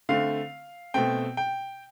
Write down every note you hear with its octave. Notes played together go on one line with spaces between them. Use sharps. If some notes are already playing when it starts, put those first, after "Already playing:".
D3 A3 C4 F5
B2 A3 C4 G5
G5